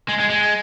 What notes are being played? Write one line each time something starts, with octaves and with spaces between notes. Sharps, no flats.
G#3
G#3
G#3